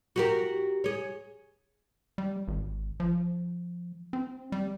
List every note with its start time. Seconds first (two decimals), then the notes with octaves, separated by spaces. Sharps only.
0.16 F#4 G4 A#4
0.84 G#4 C#5
2.18 G3
2.48 G#1
3.00 F3
4.13 C4
4.52 G3